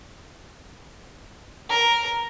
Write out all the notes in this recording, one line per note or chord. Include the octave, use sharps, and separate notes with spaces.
A#4